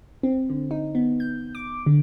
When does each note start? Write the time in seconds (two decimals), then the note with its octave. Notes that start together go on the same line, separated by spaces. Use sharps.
0.23 C4
0.50 D3
0.71 D#4
0.95 B3
1.20 G6
1.55 D6
1.86 D3